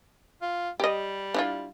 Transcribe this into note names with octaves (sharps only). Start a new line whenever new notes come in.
F4
G3 G4 D#5
D4 E4 F4